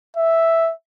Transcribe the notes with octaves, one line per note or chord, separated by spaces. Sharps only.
E5